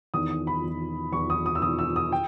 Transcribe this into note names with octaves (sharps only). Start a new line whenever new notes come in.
E2 D#3 D#6
D#6
B5
E2 D#3
E2 D#3 C#6
D#6
D#6
E6
E2 D#3 D#6
E6
D#6
G5